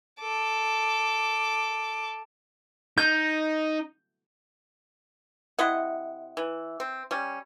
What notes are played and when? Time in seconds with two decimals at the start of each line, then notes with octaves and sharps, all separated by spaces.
0.21 A4 D6
2.98 D#4 G6
5.59 C3 E4 D#5 F#5
6.37 E3
6.80 C4
7.11 G3 C#4